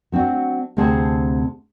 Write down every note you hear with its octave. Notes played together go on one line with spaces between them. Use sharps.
F#3 C4 D4 F#4
D2 C3 C4 G#4 C5 A5